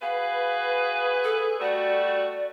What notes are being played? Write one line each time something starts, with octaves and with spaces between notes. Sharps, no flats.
F#4 G#4 B4 F5
A4
G3 A3 F#4 D5